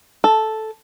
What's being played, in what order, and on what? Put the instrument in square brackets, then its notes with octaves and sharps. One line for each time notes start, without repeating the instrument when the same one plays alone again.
[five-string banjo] A4